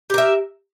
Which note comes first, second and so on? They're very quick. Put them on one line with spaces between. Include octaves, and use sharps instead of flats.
G4 A#4 E5